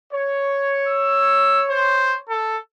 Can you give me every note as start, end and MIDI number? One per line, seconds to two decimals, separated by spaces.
0.13 2.27 73
0.88 1.64 88
1.70 2.17 72
2.29 2.57 69